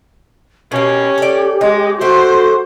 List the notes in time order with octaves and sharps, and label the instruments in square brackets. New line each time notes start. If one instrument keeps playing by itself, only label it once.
[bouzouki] B2 A#3 [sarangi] C#4 [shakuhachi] G4
[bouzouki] A4 D5
[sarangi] G#3 [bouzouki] D#4
[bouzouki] A3 G4 A4 [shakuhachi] F#4 [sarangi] C5